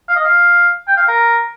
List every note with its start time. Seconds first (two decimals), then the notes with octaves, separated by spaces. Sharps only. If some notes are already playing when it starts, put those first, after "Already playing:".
0.09 F5
0.16 D#5
0.25 F5
0.88 G5
0.97 F5
1.08 A#4